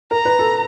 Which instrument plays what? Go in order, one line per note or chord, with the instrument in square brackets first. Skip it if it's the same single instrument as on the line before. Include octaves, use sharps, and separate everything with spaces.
[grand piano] A#4 [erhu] A#5
[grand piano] B4
A4